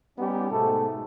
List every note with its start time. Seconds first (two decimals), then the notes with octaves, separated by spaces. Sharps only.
0.19 G3 B3 C#4 D#4 G4
0.51 G#2 B2 A3 A4